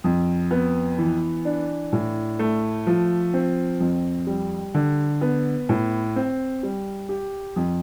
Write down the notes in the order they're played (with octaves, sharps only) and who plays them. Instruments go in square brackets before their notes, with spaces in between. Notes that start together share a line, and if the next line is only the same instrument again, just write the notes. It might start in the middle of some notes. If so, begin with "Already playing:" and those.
[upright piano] F2
B3
E3
D4
A2
A3
F3
C4
F2
G3
D3
B3
A2
C4
G3
G4
F2